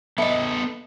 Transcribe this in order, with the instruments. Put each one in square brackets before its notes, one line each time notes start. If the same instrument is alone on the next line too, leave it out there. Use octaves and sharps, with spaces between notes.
[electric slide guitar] B3 A4 [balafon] D#5 E5